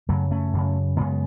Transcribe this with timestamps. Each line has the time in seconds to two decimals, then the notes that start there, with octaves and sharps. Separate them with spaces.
0.09 F#2 C#3 F#3 A3
0.31 A3 C#4
0.53 F#2 C#3
0.97 F#2 C#3 G#3 B3